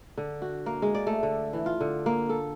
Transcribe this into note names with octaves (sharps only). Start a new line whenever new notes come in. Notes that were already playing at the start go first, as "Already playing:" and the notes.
D3
F#4
A#3
G#3
D5
A3
D3
E3
F4
D3
A#3
A4